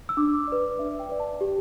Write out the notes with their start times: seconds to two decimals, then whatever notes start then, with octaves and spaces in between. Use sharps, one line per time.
0.09 E6
0.17 D4 D6
0.48 B4 D5
0.79 D4 E5
0.99 G5
1.09 B4 D5
1.20 A5
1.41 G4